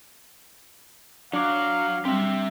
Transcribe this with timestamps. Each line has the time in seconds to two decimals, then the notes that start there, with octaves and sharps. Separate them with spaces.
1.33 F#3 D4 F5 D6
2.05 G3 C4 G4 E5